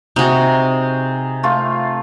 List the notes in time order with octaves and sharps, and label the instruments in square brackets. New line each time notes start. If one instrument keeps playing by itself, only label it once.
[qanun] C3 F#4 [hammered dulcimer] D#4 G#4
[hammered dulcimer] A3 F4